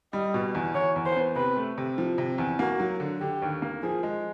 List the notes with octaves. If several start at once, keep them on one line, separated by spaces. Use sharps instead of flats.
G3 D#5
B2
E2
E2 C#5
E2
C5
B3
C3 B4
A3
C3
F3
C3
E2
A#3 F#4
F#3
D3
D3 G4
D#2
A#3
F3 G#4
G#3